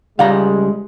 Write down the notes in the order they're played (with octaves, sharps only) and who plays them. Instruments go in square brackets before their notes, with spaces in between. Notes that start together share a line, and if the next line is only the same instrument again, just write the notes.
[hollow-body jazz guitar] C#2 G3 A#5 [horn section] G#3 [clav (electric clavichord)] F5